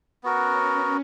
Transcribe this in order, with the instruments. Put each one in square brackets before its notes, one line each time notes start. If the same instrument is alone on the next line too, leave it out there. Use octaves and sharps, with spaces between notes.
[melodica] B3 F#4 A#4 [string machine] C#4